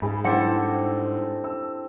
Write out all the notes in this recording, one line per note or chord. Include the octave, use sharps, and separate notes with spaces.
G#2 G#4 B5
G3 C4 D4 E4 A4 F#5 C#7
E6